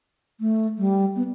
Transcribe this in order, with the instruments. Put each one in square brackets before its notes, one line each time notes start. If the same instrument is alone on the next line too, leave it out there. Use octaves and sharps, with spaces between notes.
[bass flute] A3
G3
B3